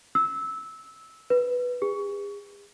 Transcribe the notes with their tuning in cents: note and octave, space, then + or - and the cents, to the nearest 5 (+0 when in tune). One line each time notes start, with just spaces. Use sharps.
E6 -15
B4 +0
G#4 -40